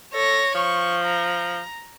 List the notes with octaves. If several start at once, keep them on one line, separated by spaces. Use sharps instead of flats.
A4 C#5 A#6
F3 C#6
A#5